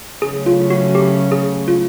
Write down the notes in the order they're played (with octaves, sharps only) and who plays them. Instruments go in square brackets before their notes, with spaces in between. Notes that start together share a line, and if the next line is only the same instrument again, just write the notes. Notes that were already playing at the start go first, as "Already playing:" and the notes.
[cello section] C#3 F#3 A3 C#4 [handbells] G#4
[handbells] F4
F#4
G4
G#4
F4